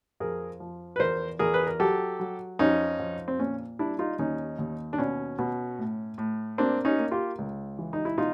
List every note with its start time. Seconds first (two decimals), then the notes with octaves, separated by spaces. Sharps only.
0.20 F2 G#4 A#4
0.60 F3
0.96 B4
1.00 E2 A#4 C5
1.39 E2 G#4 A#4
1.54 B4
1.67 A#4
1.80 F#3 G4 A4
2.20 F#3
2.59 F2 C#4 D#4
2.99 F2
3.28 C4
3.39 A#2 C#4
3.79 G3 D4 E4
3.99 D#4 F4
4.19 D#2 C#4 D#4
4.58 D#2
4.93 D4
4.98 B2 C#4
5.39 B2
5.79 A2
6.18 A2
6.58 A#3 C4 D4
6.85 C#4 D#4
6.99 A#3
7.11 F4 G4
7.38 C#2
7.79 E3
7.93 D#4
8.05 E4
8.18 B2 D#4 F4